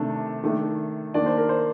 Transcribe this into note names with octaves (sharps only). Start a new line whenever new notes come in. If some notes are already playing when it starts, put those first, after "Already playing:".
Already playing: C3 D#3 A3 D4
D#3 A3 D4
D#3 A#3 D4 D5
C5
A#4
C5